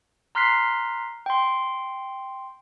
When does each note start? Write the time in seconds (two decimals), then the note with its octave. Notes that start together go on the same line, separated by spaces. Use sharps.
0.35 A#5 C6 F6 F#6 B6 C7
1.26 G5 C6